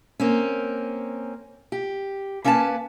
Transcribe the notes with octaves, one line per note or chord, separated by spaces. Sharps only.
A#3 C4 C#4
G4
A#3 C#4 B4 F5 A5